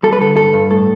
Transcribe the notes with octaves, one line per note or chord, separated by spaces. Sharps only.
G3 A4
B4
D3 A4
G2 A4
G2
A2 A4